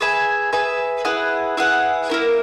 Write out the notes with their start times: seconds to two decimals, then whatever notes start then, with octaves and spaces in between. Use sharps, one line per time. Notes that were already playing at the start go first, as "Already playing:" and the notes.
0.01 G#4 B4 E5 G#5
0.53 G#4 B4 E5 G#5
1.05 E4 G#4 B4 F#5
1.57 E4 G#4 B4 F#5
2.10 A#3 E4 A#4